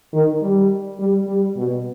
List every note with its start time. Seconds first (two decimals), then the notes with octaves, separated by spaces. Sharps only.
0.14 D#3
0.43 G3
0.99 G3
1.27 G3
1.57 B2